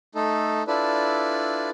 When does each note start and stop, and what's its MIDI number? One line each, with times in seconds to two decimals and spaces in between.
0.15 0.63 57
0.15 0.63 63
0.15 0.63 69
0.68 1.70 62
0.68 1.70 64
0.68 1.70 65
0.68 1.70 69
0.68 1.70 71
0.68 1.70 74